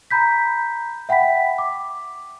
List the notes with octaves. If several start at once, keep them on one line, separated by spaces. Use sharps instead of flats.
A#5 B5 G6 B6
E5 F#5 G5 B5 B6
D6